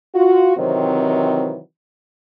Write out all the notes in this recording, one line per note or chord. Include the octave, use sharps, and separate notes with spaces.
F4 F#4
C3 D#3 E3 F#3 C4